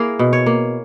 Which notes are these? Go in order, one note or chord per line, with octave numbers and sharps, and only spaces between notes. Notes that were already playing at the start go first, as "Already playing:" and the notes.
Already playing: A#3 E4 G#4 A#4
B2
C#5
A#3